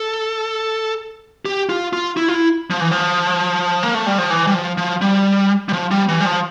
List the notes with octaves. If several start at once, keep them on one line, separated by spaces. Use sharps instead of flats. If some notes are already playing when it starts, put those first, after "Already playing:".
Already playing: A4
G4
F4
F4
E4
F4
E4
F3
E3
F3
A#3
A3
G3
F3
E3
G3
F3
F3
G3
G3
F3
G3
E3
G3
F3